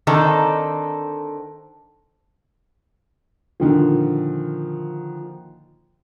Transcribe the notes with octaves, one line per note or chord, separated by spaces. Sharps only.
D3 D#3 C4 D4 D#4 A4
A#2 D3 D#3 F3